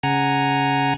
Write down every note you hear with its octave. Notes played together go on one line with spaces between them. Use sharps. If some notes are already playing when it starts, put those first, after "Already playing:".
C#3 F#5 G#5 A#5